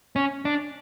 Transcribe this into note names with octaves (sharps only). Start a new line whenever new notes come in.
C#4
D4